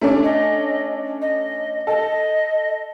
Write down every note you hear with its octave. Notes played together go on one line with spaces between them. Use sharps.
A3 C#4 D4
D#5
D#5
A4 D#5